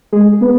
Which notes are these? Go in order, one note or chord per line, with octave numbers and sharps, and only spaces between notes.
G#3 G#4
B3 B4